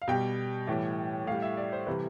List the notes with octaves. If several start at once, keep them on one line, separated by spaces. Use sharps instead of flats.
F5
B2 G3 G5
A2 E3 G3
A2 G3 F5
E5
D5
C5
C3 E3 G3 B4